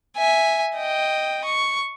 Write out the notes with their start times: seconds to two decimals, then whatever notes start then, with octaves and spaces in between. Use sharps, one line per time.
0.17 E5 G#5
0.76 D#5 G5
1.45 C#6